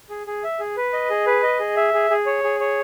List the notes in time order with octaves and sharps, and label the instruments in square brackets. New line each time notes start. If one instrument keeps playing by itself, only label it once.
[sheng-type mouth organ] G#4
G#4
E5
G#4
B4
D#5
G#4
B4
D#5
G#4
E5
G#4
G#4
C#5
G#4
C#5